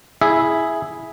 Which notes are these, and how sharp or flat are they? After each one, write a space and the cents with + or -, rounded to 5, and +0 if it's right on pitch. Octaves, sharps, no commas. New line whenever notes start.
E4 -5 G#4 +0 E5 +0